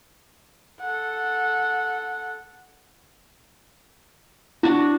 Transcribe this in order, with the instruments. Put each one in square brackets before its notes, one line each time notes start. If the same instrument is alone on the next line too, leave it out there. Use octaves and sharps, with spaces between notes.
[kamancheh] A4 F#5
[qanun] D4 F#4 [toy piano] E4